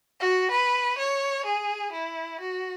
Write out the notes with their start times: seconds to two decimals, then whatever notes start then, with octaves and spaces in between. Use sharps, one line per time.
0.20 F#4
0.51 B4
0.98 C#5
1.46 G#4
1.93 E4
2.40 F#4